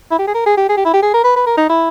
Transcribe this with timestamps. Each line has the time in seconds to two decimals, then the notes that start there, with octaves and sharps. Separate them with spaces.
0.11 E4
0.19 G4
0.27 G#4
0.34 A#4
0.46 G#4
0.57 G4
0.69 G#4
0.77 G4
0.85 E4
0.93 G4
1.02 G#4
1.14 A#4
1.24 B4
1.36 B4
1.46 A#4
1.58 D#4
1.69 E4